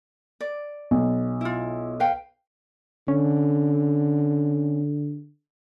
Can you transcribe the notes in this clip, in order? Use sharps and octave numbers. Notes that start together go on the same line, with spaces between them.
D5
B1
E4 F4
B4 F5 G5
D3 C#4